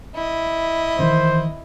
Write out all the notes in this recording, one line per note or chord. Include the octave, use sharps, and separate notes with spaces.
E4 D#5
D#3 E3 C5